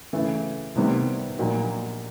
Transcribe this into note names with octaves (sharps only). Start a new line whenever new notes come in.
C#3 E3 A3
C2 C3 D#3 G3 B3
A#1 A#2 F#3 A#3 D#4